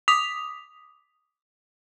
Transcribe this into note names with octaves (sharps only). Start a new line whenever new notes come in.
D6 D#6 B6 F7